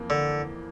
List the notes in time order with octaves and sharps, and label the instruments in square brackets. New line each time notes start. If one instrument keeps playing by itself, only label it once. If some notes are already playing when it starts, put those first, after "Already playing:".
Already playing: [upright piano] F2 E3 A#3
[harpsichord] D3